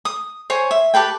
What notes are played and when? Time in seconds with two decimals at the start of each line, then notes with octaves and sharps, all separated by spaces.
0.05 D#6
0.50 C5 C#5 G#5
0.71 E5
0.94 G4 A4 B4 G5